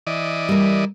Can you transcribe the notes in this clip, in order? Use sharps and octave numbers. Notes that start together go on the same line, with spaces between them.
E3 D5 D#5
G3 A#4